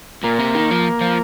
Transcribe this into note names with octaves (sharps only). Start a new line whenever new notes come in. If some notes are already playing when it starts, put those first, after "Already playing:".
A#2 A#3
C3
D#3
F3
F3